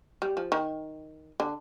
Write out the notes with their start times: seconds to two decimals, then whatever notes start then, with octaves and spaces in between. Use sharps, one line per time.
0.22 G3
0.37 F3
0.52 D#3
1.40 D3